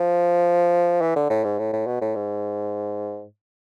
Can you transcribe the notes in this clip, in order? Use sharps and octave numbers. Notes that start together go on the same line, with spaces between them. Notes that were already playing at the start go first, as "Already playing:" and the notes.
Already playing: F3
E3
D3
A2
G#2
A2
A2
B2
A2
G#2